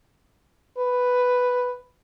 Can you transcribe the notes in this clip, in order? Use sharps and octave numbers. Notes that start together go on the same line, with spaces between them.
B4